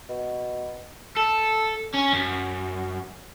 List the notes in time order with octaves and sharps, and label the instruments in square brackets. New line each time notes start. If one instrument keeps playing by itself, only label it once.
[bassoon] B2
[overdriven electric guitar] A4
C#4
F#2